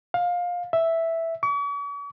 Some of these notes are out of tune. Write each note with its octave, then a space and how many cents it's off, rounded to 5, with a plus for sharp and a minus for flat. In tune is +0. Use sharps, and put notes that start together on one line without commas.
F5 +20
E5 +0
C#6 +45